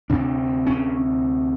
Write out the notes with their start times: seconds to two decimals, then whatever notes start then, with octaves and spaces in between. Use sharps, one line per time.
0.10 D2 C3 D4
0.67 C#4